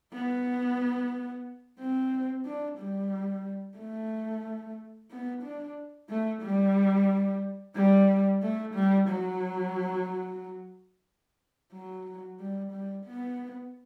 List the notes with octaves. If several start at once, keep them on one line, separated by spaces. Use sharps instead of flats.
B3
C4
D4
G3
A3
B3
D4
A3
G3
G3
A3
G3
F#3
F#3
G3
G3
B3